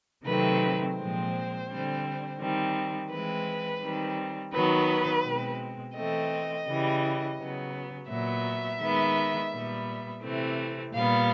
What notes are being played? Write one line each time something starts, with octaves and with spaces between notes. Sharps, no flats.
C3 D#3 F#3 A3 C4 B4
A#2 F3 G#3 C4 C5
D3 G3 C4
D#3 G3 C4
E3 G#3 C4 B4
D#3 G3 C4
D#3 F#3 B3 B4
B2 G#3 C4
E3 A3 C4 D#5
C#3 E3 G3
C#3 F#3 B3
A#2 F#3 B3 E5
D#3 G#3 B3
A#2 G3 B3
C3 E3 A3 C4
A#2 G3 B3 F5